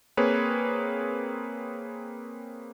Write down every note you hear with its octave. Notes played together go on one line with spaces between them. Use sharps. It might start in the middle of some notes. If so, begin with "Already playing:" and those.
A#3 C4 G#4 B4 C#5